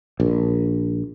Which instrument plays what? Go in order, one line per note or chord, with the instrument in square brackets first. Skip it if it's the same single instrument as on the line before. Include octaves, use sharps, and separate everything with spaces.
[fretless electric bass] A#1